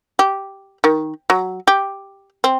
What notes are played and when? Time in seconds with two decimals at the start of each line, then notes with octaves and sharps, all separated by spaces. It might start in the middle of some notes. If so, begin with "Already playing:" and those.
0.19 G4
0.84 D#3
1.30 F#3
1.68 G4
2.44 C4